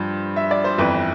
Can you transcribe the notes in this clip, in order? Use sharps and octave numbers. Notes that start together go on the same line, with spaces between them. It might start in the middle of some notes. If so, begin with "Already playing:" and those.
Already playing: G2 F3 C5
E5
D5
C5
G1 F2 E3 B4